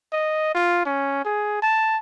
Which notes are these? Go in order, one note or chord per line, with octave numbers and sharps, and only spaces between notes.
D#5
F4
C#4
G#4
A5